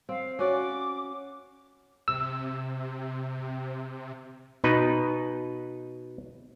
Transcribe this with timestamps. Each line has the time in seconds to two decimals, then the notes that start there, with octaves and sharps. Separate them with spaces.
0.09 C4 F5
0.39 C#4 F#4 D5 D6
2.08 C3 E6
4.64 B2 D#4 B4